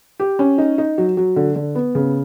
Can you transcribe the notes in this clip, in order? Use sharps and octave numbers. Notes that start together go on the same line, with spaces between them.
G4
C#4
D#4
D#4
F#3
F#3
D3
D3
B3
C#3